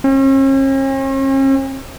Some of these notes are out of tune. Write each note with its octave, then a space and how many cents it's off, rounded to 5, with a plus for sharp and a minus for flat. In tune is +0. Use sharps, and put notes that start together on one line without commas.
C#4 -45